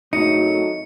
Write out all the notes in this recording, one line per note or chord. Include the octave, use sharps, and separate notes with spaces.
G#1 F#3 A3 D#4 C#7